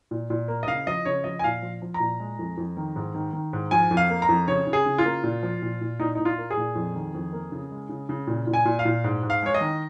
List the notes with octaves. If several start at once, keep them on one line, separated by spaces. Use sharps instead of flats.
A#2
A#2
A#3
D#5
C#3 F5
F3 D#5
C#3 C#5
F3 D#5
G#5
A#2 F5
F3
F3
A#5
A#2
G#3
F2
F2
D#3
G#2
D#3
D#3
G#2
F3 G#5
F2
F5
A#3
A#5
F2
C#3 C#5
C#3
G#4
C#3
F4
A#3
A#2
F3
A#2
A#2
A#2 D#4
A#2 D#4
F4
A#3
G#4
A#2
F2
D#3
F2
A#3
C#3
G#3
C#3
C#3
A#2
A#2
G#5
A#2
F5
A#2
G#2
G#2
F5
G#3 C#5
D#5
D#3